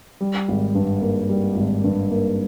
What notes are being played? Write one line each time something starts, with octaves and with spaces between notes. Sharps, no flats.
G3
G#1
G2
A#3
G3
G#1
G2
A#3